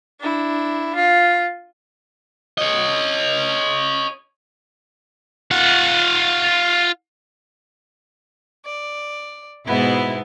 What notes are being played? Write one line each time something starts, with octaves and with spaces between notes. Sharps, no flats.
D4 E4
F4
C#5 D#5
F4 F#5
D5
G#2 B2 B3 E4